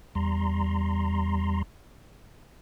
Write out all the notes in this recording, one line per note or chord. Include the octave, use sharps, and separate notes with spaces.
E2 G3 A#5 C6